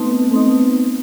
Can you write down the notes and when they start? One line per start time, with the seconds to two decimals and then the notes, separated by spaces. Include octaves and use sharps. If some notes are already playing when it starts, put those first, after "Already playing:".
Already playing: A3 B3 C4 D#4
0.31 A3 B3 C4 D#4